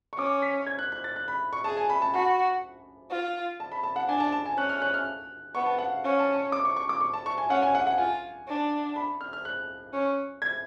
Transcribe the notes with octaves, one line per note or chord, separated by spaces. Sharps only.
C#6
C#4 D6
B6
G#6
F#6
F#6
A6
F#6
B5
C#6
G#4 A5
G#5
B5
A5
F#4 B5
F4
A5
B5
A5
F#5
D4 G#5
A5
A5
G#5
C#4 F#6
F6
F#6
F6
B3 C#6
A5
F#5
F5
C#4 F#5
A5
C#6
D6
C#6
C#6
D6
C#6
A5
C#6
G#5
C#4 F#5
G#5
F#5
F#5
F4 G#5
D4
B5
F6
F6
F#6
C#4
G#6